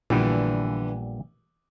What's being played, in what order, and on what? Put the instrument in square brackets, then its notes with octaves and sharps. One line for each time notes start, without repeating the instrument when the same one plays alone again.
[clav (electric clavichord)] A#1 A#2 G3 B3 [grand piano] D3 E3